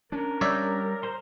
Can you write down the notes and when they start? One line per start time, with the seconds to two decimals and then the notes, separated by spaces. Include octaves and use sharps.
0.12 C#4 D4 A#4
0.41 G3 C#5 D5 E5 G6
1.03 C5 A#5 C6